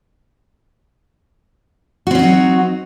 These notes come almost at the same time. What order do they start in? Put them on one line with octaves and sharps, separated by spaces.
F#4 C4 C#4 D#4 F#3